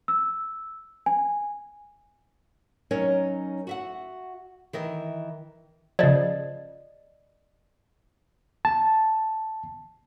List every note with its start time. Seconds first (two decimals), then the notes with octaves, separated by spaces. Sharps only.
0.08 E6
1.06 G#5
2.91 F#3 C#4 D#4 A#4 C#5 D#5
3.67 F#4 E5 F#5
4.73 D#3 E3 D#5 E5
5.99 C#3 F3 D5 D#5
8.65 A5